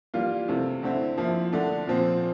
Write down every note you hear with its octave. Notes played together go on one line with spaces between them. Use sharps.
E3 G3 A#3 F4
C3 E3 A3
D3 A3 C4 E4
F3 A#3 E4
D3 A3 D4
A#2 F3 C4